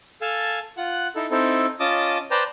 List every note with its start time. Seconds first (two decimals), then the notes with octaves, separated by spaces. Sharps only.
0.21 A4 F5 G#5 A5
0.77 F4 F#5 F#6
1.15 D#4 E4 A4
1.31 C4 D#4 E4 A4
1.80 C#4 F4 D#5 A5 D6 D#6
2.31 B4 C5 D5 G5 A5 A#5